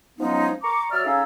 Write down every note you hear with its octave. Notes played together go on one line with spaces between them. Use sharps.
F3 F#3 G#3 B3 C#4 D#4
A#5 C#6 D6
F#3 D5 E5 F6
C#3 C#4 D#4 A4 F5 E6